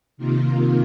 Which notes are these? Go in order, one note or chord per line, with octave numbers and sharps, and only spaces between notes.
C3 D#3 A#3 F4